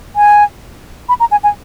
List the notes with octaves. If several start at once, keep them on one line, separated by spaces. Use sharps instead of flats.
G#5
B5
A#5
G#5
G#5